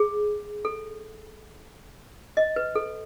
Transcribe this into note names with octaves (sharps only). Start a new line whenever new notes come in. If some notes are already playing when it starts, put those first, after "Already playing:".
Already playing: G#4
A4
D#5
B4
A4